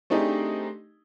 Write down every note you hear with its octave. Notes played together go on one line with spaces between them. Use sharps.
A3 C4 D4 D#4 G4 G#4